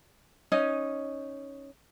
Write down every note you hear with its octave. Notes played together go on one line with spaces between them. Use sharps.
C#4 D#4 D#5